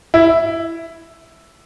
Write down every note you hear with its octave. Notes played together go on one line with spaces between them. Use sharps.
E4